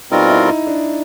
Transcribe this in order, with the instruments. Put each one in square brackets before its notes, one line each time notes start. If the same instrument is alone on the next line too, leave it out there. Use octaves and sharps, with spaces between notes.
[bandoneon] B2 G3 C4 F4 A#4 [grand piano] D#4
[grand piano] E4
D#4
D4